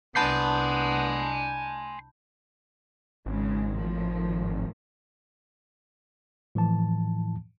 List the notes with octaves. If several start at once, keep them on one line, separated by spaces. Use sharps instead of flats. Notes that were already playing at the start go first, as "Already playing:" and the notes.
C2 B3 D4 G#5 A5 B5 C6 G6
G#1 C#3 G#3
A2 D#3 F3
A2 E3 F3 A5